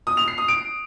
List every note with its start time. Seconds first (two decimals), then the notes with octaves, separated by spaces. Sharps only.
0.07 D#6
0.17 F7
0.28 C7
0.38 D#6
0.48 D7